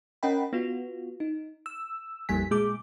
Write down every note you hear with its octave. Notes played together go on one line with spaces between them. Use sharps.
C#4 A#4 D#5 F#5 G5 B5
B3 F4 F#4
D#4
E6
A#1 F2 G3 A#3 G#5 B6
A#2 G#3 G#4 D6